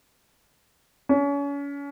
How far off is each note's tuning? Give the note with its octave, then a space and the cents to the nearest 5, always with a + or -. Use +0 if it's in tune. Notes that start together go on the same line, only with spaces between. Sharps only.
C#4 +35